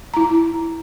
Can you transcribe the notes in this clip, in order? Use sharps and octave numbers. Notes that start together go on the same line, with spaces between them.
E4 A#5